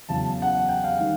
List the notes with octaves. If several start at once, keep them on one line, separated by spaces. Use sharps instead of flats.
E2 C#3 F#3 A5
F#5
G5
F5
D#3 G3